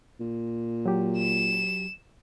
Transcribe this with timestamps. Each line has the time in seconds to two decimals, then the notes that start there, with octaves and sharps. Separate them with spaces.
0.20 A#2
0.86 F#3 G4
1.17 E7